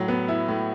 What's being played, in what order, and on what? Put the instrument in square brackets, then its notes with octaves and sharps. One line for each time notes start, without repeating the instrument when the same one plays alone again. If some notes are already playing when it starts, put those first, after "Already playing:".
Already playing: [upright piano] A2 F#3
B3
E4
A2